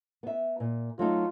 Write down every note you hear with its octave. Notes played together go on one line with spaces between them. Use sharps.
B3 E5
A#2
F#3 A3 D#4 F4